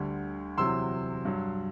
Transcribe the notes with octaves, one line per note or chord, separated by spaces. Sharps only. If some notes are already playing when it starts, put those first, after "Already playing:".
Already playing: D2 D3 G3
E2 C3 F#3 C6 E6
G2 F#3